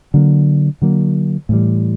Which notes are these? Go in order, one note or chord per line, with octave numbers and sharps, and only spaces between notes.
D3 F#3 A#3
D3 F#3 A#3
A2 E3 G3